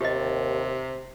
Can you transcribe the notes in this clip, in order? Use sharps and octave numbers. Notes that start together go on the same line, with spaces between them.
D#2 C3 G4 D#5